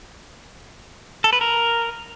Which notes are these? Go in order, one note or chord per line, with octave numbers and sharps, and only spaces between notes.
A4
B4
A#4